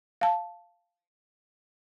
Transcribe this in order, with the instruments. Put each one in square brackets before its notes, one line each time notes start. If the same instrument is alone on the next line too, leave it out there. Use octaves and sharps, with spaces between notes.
[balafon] F5 A5